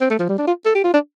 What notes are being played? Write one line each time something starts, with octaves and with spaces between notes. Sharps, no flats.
C4
A3
F3
G3
D4
F4
A4
G4
F4
D4